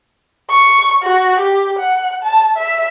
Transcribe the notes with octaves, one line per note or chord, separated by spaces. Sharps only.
C#6
F#4
G4
F#5
A5
E5